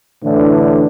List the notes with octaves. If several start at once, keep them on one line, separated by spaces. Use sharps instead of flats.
A2 D3 E3 D4